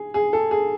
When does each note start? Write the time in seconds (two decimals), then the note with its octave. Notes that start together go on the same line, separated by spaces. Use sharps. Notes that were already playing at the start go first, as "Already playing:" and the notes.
Already playing: G#4
0.14 G#4
0.33 A4
0.51 G#4